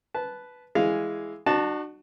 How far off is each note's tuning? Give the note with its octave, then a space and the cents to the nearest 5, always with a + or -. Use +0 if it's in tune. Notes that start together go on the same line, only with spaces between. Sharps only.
B4 +0 A5 -15
E3 +5 G#3 +0 F5 +0
D4 +45 F#4 +5 A5 +0